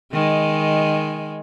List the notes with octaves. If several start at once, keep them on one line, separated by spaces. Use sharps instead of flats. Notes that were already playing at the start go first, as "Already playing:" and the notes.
D#3 G#3